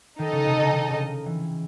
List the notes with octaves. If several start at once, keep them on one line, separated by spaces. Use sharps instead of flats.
D#3 D#4 A4 D#5
C#3
C3
C#3
D#3
C#3
E3